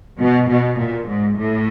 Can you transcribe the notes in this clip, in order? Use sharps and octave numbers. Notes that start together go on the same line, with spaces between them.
B2
B2
A#2
G#2
A2